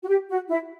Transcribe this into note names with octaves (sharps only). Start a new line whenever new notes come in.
F#4
G4
F#4
E4